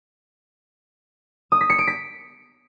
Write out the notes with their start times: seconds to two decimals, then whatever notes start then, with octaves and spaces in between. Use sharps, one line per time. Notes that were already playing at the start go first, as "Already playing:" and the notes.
1.52 D#6
1.61 B6
1.70 C#7
1.79 D7
1.87 B6